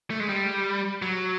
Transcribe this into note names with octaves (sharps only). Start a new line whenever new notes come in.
A3
G#3
G3
F#3